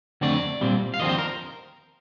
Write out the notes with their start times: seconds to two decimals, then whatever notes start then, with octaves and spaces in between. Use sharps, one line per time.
0.21 F2 D3 A3 C4 D5
0.61 A#2 G3 C4
0.94 F5
0.99 D#2 D3 F3 C4 D#5
1.09 C5
1.18 A#4